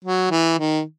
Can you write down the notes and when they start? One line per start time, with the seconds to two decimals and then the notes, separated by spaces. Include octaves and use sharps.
0.05 F#3
0.31 E3
0.59 D#3